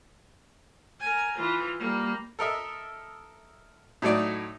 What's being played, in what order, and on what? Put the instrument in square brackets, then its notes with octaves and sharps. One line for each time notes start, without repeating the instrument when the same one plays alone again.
[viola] A#4 G#5
E3 F4
G3 A#3
[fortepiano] A4 A#4 D#5 E5
A2 F#3 A3 D#4 D5 D6